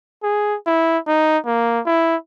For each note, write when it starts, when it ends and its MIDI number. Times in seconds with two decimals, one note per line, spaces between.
0.23 0.56 68
0.66 0.98 64
1.07 1.38 63
1.46 1.80 58
1.86 2.16 64